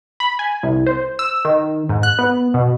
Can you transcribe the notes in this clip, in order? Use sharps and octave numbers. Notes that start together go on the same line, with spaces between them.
B5
G#5
C2
C5
E6
D#3
G#2
F#6
B3
B2